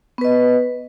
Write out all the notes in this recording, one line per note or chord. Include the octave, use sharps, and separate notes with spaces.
B3 B4 D#5